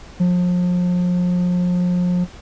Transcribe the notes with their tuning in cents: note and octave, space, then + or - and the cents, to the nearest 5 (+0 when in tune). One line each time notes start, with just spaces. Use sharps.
F3 +35